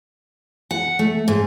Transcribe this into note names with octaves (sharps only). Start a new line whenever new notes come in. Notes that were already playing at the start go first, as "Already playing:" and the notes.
F#5
A3
G#2